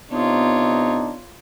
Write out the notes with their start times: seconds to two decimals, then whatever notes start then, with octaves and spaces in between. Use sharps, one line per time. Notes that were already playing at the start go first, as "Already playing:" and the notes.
0.12 C3 B3 D4 D#4 F4 C#5